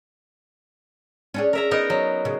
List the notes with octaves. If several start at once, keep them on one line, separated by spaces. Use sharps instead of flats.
C#4 D4 G#4
A#4 E5 A#5
B3 D#4 A#4
F#3
C#3